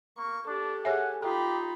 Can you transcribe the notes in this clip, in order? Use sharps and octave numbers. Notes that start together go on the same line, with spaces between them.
A#3 C#6
D4 G4 A4
G#4 C#5 E5 F#5 G#5
D#4 F4 G4 A4 B5